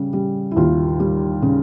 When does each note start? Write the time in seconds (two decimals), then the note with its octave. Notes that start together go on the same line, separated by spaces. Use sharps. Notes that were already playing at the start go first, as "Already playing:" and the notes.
Already playing: C#3 G3
0.13 G3
0.51 E4
0.56 D#2 F4
1.00 G3
1.42 C#3